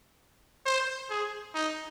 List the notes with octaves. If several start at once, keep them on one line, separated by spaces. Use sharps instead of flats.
C5
G#4
D#4